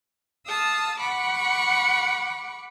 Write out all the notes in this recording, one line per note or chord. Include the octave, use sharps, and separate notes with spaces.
F5 A5 D#6 E6
F#5 B5 C#6 D6